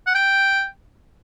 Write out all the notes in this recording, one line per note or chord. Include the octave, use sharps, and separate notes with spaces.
F#5
G5